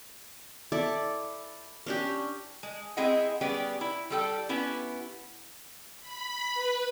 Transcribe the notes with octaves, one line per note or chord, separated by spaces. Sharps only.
E4 A4 D5
C#4 D4 G4
G#3
G#3 C4 E4 G#4 D#5 F#5
G3 B3 C#4 G4 G#4 D5
E4
G3 A4 G5
B3 C#4 E4 G4
B5
B4